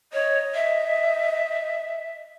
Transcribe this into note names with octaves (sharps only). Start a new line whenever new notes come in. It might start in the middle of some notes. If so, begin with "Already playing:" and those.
C#5 D#5
E5